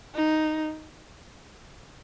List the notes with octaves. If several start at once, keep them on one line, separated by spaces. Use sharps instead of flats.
D#4